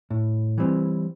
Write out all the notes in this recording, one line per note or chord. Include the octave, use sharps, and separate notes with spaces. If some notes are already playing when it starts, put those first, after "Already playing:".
A2
E3 G3 C4